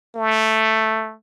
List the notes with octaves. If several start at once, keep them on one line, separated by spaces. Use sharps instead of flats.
A3